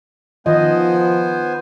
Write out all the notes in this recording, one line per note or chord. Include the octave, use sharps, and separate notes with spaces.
D#3 F3 B3 C5 D#5 G#5